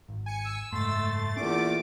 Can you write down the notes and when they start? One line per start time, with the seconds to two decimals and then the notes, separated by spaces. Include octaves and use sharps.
0.09 G#1
0.26 G#5 C#7
0.45 E6
0.72 F#1 G#2 A3 C6 A6
1.37 E2 A#2 C#4 D6